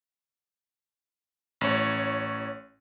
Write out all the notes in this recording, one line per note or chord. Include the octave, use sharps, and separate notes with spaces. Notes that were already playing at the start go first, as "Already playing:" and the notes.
A1 C#5